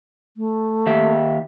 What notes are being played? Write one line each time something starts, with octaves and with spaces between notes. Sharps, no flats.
A3
D#2 G4 E5